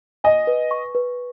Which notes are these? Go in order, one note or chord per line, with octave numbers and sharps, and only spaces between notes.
D#5 G#5
B4
C#6
B4